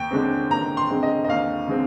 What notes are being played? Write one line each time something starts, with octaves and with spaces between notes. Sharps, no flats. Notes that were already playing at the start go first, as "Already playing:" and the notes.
Already playing: D#2 G5
D3 G#3 C4
D#2 A#5
C6
D3 G#3 C4
D#5
D#5
D#2 F5
D3 G#3 C4